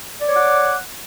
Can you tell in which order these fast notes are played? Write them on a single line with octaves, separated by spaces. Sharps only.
D5 C#5 D6 F#5